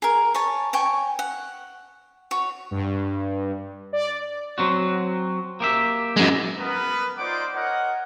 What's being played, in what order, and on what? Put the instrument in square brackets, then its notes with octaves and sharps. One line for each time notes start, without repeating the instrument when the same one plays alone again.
[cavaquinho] G#4 A#4
C#5 G#5 A5
C#5 G5 G#5 C#6
F#5
F#4 C#5
[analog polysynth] G2
D5
[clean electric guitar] F#3 C4 F#4
A#3 G4 E5
[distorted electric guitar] F#2 G#3
[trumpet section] B3 A#4 B4
D#4 F4 C5 D5 F#5 D6
A#4 C#5 D#5 F#5